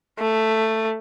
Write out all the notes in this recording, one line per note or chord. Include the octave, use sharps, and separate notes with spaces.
A3